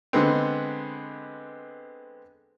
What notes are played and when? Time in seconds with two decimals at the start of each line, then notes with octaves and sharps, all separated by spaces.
0.13 D3 G#3 B3 C4